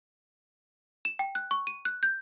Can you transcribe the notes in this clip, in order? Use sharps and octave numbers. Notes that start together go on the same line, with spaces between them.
E7
G5
F#6
C#6
D#7
F#6
G6